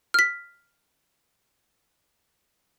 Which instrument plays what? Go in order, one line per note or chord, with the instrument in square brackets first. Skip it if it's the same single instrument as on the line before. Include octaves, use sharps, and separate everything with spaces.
[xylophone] F6 B6